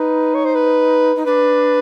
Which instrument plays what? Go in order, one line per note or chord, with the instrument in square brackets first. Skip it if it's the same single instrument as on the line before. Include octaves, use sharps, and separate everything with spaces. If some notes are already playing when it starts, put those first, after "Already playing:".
Already playing: [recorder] D#4 [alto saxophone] B4
[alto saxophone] C#5
C5
B4
[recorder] D#4
[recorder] D4 [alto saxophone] B4